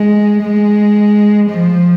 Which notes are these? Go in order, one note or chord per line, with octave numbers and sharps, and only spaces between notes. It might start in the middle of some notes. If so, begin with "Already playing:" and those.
Already playing: G#3
G#3
F3